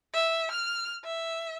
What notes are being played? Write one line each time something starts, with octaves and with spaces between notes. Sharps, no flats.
E5
F6
E5